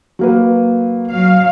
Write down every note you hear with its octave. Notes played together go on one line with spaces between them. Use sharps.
F#3 A#3 B4
F#3 F5